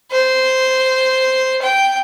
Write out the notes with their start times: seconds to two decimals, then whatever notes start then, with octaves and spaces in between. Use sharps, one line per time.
0.12 C5
1.62 G5